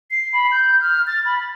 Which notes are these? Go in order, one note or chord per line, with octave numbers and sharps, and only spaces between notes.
C7
B5
G6
F6
A6
B5